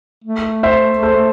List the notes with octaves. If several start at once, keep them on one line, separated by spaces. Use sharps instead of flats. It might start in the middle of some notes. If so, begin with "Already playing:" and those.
A3
C5 E5
A4 C5